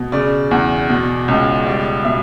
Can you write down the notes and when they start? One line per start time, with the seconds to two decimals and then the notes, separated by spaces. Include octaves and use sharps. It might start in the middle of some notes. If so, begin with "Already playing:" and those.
Already playing: B2
0.12 C#3 D5
0.51 E2
0.90 B2
1.28 C#2
1.67 G3 D5
2.05 B2 E5